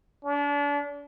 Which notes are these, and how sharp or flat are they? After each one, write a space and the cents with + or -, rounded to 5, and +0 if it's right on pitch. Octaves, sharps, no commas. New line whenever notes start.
D4 -35